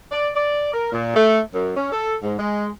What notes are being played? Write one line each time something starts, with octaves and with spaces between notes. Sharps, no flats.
D5
D5
A#4
A#2
A3
F#2
C#4
A4
G#2
G#3